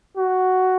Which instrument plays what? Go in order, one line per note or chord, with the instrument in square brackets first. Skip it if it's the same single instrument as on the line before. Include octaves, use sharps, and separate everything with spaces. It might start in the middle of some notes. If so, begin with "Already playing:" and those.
[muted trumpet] F#4